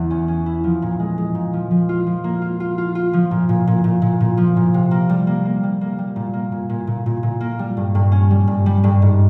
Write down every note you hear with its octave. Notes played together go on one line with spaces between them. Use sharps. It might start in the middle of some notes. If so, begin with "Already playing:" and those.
Already playing: E2 E3
C#4
C#4
E4
F3
A#2
G#3
G#3
A#2
F3
F3
F4
F3
A#3
F4
F4
F4
F4
F3
A#2
A#2
A#2
A#2
A#2
A#2
F3
A#2
C3
A#3
G3
A#3
A#3
G3
A#3
G3
A#2
A#3
A#2
A#2
A#2
A#2
A#2
A#3
G3
G2
G2
C#4
G3
G2
G3
G2
G#2